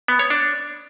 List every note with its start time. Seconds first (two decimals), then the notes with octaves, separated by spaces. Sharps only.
0.08 B3
0.19 C#5
0.30 D4